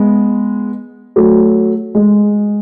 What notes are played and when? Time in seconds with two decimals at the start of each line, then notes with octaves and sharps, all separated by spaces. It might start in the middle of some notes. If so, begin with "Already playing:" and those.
Already playing: G#3 B3
1.16 F#3 A3
1.95 G#3